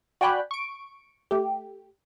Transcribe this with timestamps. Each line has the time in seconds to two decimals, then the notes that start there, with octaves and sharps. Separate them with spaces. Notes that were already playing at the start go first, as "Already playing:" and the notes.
0.21 F#4 D5 G5 G#5 B5 F#6
0.51 C#6 D7
1.31 A3 G4